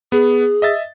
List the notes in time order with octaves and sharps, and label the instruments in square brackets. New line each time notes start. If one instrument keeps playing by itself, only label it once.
[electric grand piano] B3 [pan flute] G#4
[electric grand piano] D#5 E5 A6